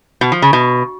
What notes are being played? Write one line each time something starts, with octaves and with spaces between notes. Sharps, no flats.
B2
F3
C#3
B2